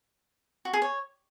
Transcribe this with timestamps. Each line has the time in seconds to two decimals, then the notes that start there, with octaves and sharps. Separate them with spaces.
0.65 F#4
0.73 G#4
0.82 C#5